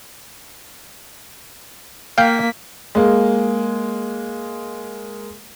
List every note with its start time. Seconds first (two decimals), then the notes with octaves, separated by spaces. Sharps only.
2.18 A#3 F5 G5 B6
2.95 G#3 A#3